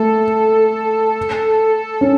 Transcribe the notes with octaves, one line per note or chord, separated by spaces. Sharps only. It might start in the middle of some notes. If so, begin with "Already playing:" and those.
Already playing: A3 A4
C#4